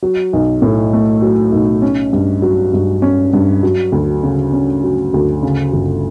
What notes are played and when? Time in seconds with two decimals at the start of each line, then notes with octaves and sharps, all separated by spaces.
0.02 F#3
0.33 B1
0.62 A2
0.93 A3
1.22 F#3
1.52 B1
1.82 C#4
2.13 G2
2.42 F#3
2.73 G2
3.02 C#4
3.33 G2
3.63 F#3
3.92 D2
4.23 C#3
4.52 C#4
4.84 F#3
5.14 D2
5.43 C#3
5.73 G1